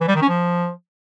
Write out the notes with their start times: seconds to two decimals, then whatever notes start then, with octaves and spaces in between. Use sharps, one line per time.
0.01 E3
0.08 G3
0.15 D#3
0.22 C#4
0.29 F3